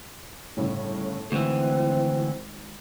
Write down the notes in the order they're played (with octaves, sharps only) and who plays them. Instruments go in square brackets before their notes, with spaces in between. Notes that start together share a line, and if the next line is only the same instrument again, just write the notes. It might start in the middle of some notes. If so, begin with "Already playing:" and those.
[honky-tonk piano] G1 A2 C#3 [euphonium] A4
[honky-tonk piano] G#1 [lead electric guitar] D2 E3 [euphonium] C4